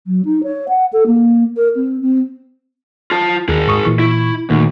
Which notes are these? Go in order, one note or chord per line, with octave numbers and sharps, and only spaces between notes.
F#3
D#4
C#5
F#5
A4
A#3
A#4
C4
C4
F4 A5
D#2 G#4 A#4
G#2 C#6 D#6
A#2 E3 C#6
E4
D2 A#2 D#3 A#3